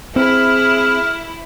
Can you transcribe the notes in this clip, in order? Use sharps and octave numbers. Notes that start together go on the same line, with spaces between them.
C4 E4 G#4 F6